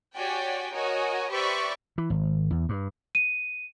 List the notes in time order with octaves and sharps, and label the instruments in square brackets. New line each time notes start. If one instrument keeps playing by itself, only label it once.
[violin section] F#4 G4 C#5 D5 G5 G#5
F#4 A#4 C#5 D#5 G#5
G4 B4 C5 D5 E5 C#6
[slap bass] E3
G#1
E2
G2
[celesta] D#7